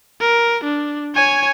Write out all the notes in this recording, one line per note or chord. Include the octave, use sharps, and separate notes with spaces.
A#4
D4
C#5 G#5